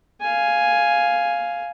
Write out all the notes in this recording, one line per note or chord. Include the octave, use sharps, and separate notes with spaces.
F5 G#5